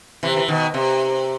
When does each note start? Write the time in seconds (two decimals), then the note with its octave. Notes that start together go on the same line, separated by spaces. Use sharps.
0.23 C3 E3
0.36 E3
0.48 B2 D#3
0.74 C3